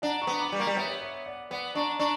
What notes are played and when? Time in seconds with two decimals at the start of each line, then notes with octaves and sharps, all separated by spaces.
0.02 D4 F#5 A#5
0.22 A#5 C#6
0.27 B3
0.39 B5 D6
0.50 G3 D6
0.58 A#3 A#5 C#6
0.67 G3
0.76 B3 C#5 E5
1.01 C#5 E5
1.26 D5 F#5
1.50 B3 D5 F#5
1.75 D4 A#5 C#6
1.99 D4 A#5 C#6